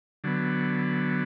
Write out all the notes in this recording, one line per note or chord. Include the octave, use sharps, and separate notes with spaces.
D3 F#3 B3